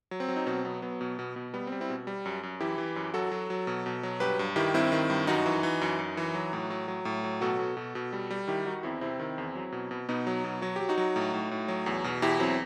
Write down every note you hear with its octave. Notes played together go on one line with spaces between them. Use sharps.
F#3
C4
F#3
D#4
B2 C4
F#3 B3
F#3 B3
B2
B2
B2
G3 B3
C4
G3
C4 E4
B2
G3
F#2
F#2
E3 E4 G4
E3
F#2
F#3 F#4 A4
F#3
F#3
B2
B2
F#3
G2 G4 B4
G2
D#3 E4 G4
G2 C4 E4
D#3
G2
F#2 D#4 F#4
E3
E3
F#2
F#2
E3
F#3
A2
F#3
F#3
A2
F#3
B2 F#4 A4
B2
B2
B2
G3
G3
D#3 E4 G4
D#3 D#4 F#4
E2 C4 E4
C3 C4 E4
D#3
E2
F#3
B2
B2
B2 B3 D#4
F#3
B2
F#3 F#4
F#3 G4
D#4 F#4
F#3
A2
A2
A2
F#3
E2
B2
E2 E4 G4
F#3 C4 E4